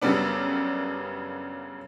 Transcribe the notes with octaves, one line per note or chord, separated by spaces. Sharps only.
F#2 C#3 G3 B3 D4